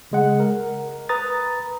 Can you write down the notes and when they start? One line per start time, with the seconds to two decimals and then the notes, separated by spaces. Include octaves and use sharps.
0.12 C#3 G#3 F#5
0.40 A#4
1.09 B4 A#5 D#6 A6